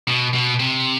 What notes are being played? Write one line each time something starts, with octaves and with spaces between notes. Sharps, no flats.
B2
B2
C3